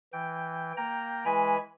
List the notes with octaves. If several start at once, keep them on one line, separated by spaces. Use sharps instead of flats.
E3 G5
A#3 G5 A#5
E3 G#3 G#5 B5